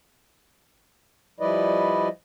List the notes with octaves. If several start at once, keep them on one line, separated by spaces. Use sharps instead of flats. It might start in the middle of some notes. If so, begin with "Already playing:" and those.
F3 G3 E4 B4 D5 D#5